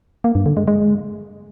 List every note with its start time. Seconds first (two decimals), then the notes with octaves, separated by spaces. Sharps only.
0.24 A#3
0.35 G2
0.46 D3
0.57 G#3
0.68 G#3